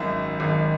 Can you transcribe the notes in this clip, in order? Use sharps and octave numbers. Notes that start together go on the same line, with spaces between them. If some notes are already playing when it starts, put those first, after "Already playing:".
Already playing: G#1 F#2 D#3 E5
G#1 F#2 D#3